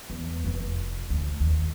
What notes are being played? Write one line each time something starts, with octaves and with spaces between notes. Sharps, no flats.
E2
F1
D2
D#2